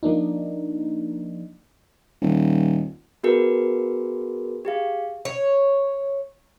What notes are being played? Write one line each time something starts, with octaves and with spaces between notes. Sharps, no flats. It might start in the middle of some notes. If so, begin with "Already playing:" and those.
F3 A#3 D4 D#4
D#1
B3 F#4 G#4 A#4 B4
G4 G#4 F5
C#5